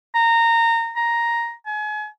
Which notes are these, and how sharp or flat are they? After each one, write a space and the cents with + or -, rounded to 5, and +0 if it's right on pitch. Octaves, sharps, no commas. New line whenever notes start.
A#5 -20
A#5 +5
G#5 +35